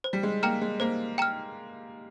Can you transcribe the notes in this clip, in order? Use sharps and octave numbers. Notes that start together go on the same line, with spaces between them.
C5
G3
G#3
A#3 G5 A#5 F6
G#3
A#3 C5
G5 A#5 F6